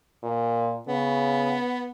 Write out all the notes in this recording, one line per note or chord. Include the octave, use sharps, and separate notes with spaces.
A#2
C#3 B3